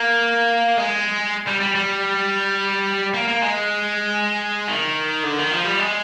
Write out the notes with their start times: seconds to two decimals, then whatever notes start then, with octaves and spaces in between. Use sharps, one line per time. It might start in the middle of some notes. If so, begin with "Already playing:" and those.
Already playing: A#3
0.77 G#3
1.47 G3
1.60 G3
1.75 G3
3.14 A#3
3.28 A#3
3.43 G#3
4.68 D#3
5.23 D3
5.38 D#3
5.51 F3
5.65 G3
5.79 G#3